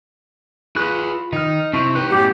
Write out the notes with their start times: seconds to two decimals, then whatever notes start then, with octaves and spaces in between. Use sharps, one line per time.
0.76 F4 G#4 B4 B5 C#6 F#6
1.33 D#3 D#4 F6
1.73 C3 D4 E4 C#6
1.95 E3 D#4 G4 B4
2.10 F#2 A2 B3 C#4 G4 F#5 G5